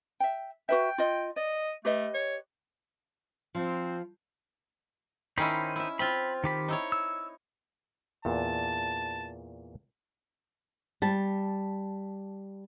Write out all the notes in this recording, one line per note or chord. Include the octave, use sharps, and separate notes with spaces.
E5 G5
F#4 B4 E5 G5
F4 D#5
D5 D#5
A3 G4 B4 D#5
C#5
F3 C4
D#3 C#4 D#4 E4 C5 B5
E4 E5
C4 F4 B5
D#3 G4 B5
D#4 E4 C#5
E6
E2 A#2 A5
G3 A5